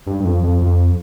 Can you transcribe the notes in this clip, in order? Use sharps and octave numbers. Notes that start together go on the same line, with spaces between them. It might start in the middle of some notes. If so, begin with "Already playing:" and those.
G2
G2
F2
F2
F2